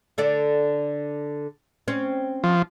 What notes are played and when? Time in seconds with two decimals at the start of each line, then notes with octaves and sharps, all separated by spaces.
0.18 D3 A4 D5
1.88 C4 C#4
2.44 F3